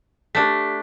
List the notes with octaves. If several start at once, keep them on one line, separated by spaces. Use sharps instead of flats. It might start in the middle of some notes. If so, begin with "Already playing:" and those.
A3 D4 G4 B6